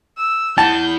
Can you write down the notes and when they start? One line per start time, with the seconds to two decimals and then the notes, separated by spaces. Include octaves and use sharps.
0.18 E6
0.58 E4 F#5 A5 G6